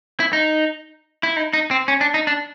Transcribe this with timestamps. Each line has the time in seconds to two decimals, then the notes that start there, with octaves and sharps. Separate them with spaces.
0.20 E4
0.33 D#4
1.23 E4
1.36 D#4
1.53 D#4
1.71 C4
1.88 C#4
2.01 D4
2.14 D#4
2.27 D4